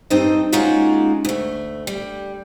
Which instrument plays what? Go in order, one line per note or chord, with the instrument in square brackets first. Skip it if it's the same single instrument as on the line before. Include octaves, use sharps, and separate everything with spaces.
[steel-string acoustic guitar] G2 C4 D#4 A4 C5 D#5
G#3 A#3 C#4 D#4 F4 F#4
D2 A3
G3